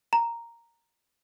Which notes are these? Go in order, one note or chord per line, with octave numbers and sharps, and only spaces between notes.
A#5